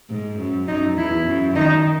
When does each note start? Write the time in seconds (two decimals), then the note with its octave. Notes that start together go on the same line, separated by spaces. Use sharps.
0.09 G#2
0.39 F#2
0.68 F#2 D#4
0.98 E2 E4
1.27 F#2
1.56 D#3 D#4